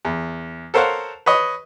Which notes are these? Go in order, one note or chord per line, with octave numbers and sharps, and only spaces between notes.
E2
A4 A#4 C5 C#5 F5 F#5
B4 C#5 D#5